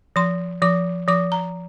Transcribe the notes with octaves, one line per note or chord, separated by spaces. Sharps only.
F3 C6
F3 D6
F3 D6
A#5